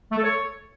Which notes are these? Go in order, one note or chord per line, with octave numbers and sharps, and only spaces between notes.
A3
A4
C#5